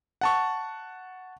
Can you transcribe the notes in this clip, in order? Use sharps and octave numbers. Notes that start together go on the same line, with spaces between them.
F#5 A5 C#6